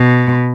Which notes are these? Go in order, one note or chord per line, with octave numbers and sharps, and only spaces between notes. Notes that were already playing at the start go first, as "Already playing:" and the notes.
Already playing: B2